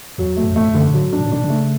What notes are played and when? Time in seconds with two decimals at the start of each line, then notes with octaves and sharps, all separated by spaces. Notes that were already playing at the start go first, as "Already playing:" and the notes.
0.18 E2 F#3
0.37 A3
0.43 F#2
0.51 E2
0.56 F#2 A3
0.68 F#2
0.75 D3
0.88 A2
0.94 G#2 F#3
1.13 D4
1.19 B2
1.26 A2
1.32 B2 D4
1.44 C#3
1.50 A3